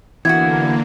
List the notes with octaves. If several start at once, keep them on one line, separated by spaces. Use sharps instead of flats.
D3 E3 A#3 B3 E4 F#4 G#6